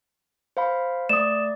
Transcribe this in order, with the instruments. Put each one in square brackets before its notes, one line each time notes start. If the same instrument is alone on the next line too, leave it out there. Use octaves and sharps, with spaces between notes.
[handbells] C5 F5 B5
[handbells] A3 D5 [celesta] D#6 E7